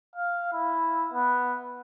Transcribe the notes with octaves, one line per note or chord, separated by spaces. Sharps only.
F5
E4
B3